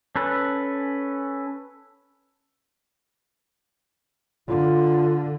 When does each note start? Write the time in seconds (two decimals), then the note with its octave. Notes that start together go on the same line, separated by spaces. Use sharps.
0.16 C#4 A4 B4
4.48 D3 F4